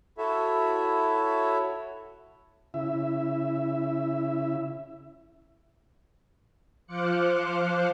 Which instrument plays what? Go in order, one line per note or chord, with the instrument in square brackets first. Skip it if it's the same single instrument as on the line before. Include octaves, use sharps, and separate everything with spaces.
[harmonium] E4 F#4 A4 C#5 E5
[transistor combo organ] C#3 E4 E5
[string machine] F3 C5 F5 D6 F#6 C#7